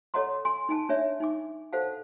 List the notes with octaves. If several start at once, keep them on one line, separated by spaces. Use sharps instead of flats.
A4 C#5 D#5 F#5 A#5 C6
G#5 C6
D#4 G#5 A5
D4 C#5 E5
D#4 G#5 D6
A4 C5 F5 F#5 A5